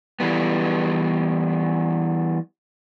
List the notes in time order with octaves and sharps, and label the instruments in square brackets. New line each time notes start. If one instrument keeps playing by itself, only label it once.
[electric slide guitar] E3 G3 B3